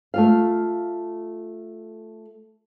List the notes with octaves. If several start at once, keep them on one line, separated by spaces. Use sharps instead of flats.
A3 F4 F5